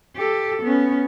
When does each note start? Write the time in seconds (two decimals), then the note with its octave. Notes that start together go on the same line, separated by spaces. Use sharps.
0.17 G4 A4
0.63 B3 C#4